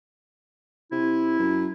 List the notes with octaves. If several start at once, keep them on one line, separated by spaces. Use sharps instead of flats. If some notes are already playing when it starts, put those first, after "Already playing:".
C3 E4
F#2